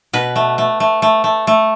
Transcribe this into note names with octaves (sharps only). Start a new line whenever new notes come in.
B2 B4
A3
A3
A3
A3
A3
A3